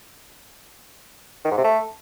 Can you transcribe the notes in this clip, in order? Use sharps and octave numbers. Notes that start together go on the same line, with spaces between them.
D#3
G#2
C3
A3